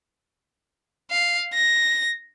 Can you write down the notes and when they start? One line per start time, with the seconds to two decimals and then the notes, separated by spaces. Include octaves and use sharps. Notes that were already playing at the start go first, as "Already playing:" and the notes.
1.11 F5
1.54 A#6